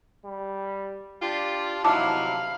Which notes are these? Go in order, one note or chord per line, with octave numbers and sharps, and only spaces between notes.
G3
D4 F4 G4
C3 F#3 D#4 E4 F5 A5 B5 D6